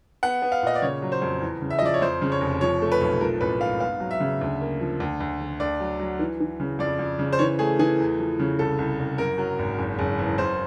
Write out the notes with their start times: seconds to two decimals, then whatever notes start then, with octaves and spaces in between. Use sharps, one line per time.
0.23 B3 F#5
0.42 B3
0.52 F5
0.62 A#2 D#5
0.75 D5
0.82 C#3 C#5
1.02 F#3
1.12 C5
1.22 F2
1.41 E2
1.62 C#3
1.70 E5
1.79 D#5
1.82 F3 D5
1.94 C#5
2.01 F2 C5
2.22 C#3
2.32 C#5
2.41 F1
2.61 F3 C#5
2.82 A3
2.92 B4
3.01 B1
3.21 F3 A#4
3.41 A1 B4
3.61 G#2 F5
3.80 B3 F5
4.00 F#3
4.11 E5
4.20 C#3
4.41 D2
4.61 A#3
4.81 F3
5.00 D2
5.20 D2
5.41 D3
5.60 D2 D5
5.80 F#3
5.99 F#3
6.19 E3
6.40 E3
6.60 C#3
6.79 F2 D5
6.99 F2
7.19 C#3
7.32 C5
7.39 E3 C#5
7.59 A3 G#4
7.79 E3 G#4
7.99 E2
8.19 F3
8.39 C#3
8.59 C2 A4
8.78 C2
8.99 C2
9.18 F#2 A#4
9.38 F#3
9.59 G#1
9.79 F#1
9.99 F#1
10.19 E2
10.38 F#2 C5